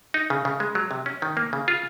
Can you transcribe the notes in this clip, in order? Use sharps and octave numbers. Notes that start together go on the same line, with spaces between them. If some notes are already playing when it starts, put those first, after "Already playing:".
D#4
C#3
C#3
G#3
F#3
C3
C#4
D#3
A#3
C#3
F4